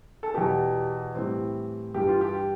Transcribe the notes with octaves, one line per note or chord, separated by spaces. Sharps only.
A4
E2 B2 B3 G4
A2 E3 G3 C4
G2 E3 G3 G4
F4
G4